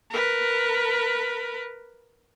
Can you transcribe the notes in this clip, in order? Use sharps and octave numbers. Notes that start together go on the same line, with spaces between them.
A#4 B4